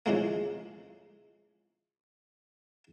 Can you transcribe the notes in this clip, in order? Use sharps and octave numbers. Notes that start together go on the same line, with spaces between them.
C#3 E3 F3 G#3 A#3